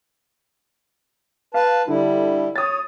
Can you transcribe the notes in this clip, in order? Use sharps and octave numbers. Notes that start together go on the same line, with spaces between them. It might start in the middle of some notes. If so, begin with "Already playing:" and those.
B4 F5 A5
D3 G3 E4
C#5 D#6 A6